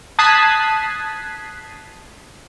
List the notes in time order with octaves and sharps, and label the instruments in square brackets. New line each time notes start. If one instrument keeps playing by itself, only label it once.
[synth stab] A5 D#6 F#6 G#6 B6 C7